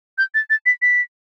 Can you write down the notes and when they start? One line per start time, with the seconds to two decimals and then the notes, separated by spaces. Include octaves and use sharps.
0.18 G6
0.34 A6
0.50 A6
0.66 B6
0.82 B6